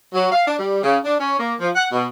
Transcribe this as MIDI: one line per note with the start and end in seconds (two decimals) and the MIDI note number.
0.14 0.30 54
0.32 0.47 77
0.47 0.55 62
0.59 0.81 55
0.83 0.97 49
1.04 1.15 62
1.20 1.38 61
1.39 1.55 58
1.60 1.70 53
1.76 1.86 78
1.92 2.06 47